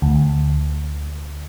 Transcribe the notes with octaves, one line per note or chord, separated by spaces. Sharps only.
D2